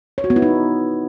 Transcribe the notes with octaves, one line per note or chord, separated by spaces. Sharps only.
C#5
F#4
B3
E4
D#4